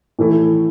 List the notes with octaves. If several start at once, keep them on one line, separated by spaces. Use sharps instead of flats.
A2 E3 A3 E4